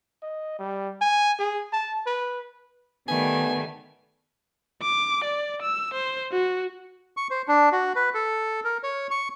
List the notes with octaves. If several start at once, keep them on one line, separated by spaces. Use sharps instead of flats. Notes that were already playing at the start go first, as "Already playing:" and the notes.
D#5
G3
G#5
G#4
A5
B4
D#3 G3 A3 B3 G#5
D6
D5
E6
C5
F#4
C#6
C5
D4
F#4
B4
A4
A#4
C#5
C#6